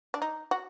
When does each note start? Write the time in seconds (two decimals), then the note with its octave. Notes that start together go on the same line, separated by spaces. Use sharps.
0.14 D4
0.22 D#4
0.51 F#4